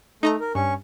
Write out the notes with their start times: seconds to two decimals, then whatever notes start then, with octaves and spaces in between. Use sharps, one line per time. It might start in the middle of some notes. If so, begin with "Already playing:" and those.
0.23 A3 D#4 D#5 A#5
0.40 A#4
0.55 G2 C#4 C#6